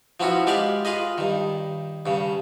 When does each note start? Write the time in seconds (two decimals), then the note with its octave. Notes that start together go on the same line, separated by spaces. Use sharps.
0.20 F3 B3 C#4 E4 F#4
0.47 G#3 G4 B4 D5 F5
0.85 F4 G#4 B4 D#5
1.18 G2 D#3
2.06 G2 C#3